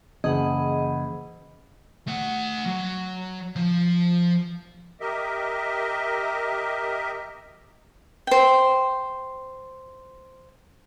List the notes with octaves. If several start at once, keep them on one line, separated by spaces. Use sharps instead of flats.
F#1 E3 G#4 D#5 F#5 B5
A3 F#5
F#3
F3
G4 A#4 D#5 E5
C5 G5